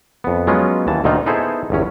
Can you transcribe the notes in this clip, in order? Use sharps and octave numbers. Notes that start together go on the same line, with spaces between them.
F2 B3
F#3 G#3 B3 C#4 F4
D#2 E3 A5
D2 A#2 D3 D#3 D#4 F4
B3 D#4 E4 G#4 A4 C5
G1 E2 C#4